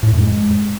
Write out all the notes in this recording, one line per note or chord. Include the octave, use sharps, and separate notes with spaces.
A2
F2
G#3